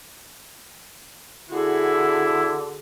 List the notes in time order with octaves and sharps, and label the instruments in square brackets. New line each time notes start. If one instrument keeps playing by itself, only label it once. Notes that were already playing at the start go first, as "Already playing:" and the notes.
[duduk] D3 [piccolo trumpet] E4 [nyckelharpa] F#4 G#4